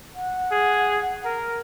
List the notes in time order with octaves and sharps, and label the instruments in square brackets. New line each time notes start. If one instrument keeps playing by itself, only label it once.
[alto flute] F#5
[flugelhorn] G#4
A#4